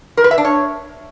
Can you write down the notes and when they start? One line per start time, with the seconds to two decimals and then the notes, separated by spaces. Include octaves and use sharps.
0.17 A#4
0.24 B4
0.31 E5
0.38 D4
0.45 C#5